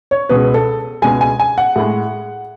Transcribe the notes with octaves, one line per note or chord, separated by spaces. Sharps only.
C#5
C#2 B2 G#3 B4
A4
C#2 B2 G#3 G#5
G#5
G#5
F#5
A2 G#3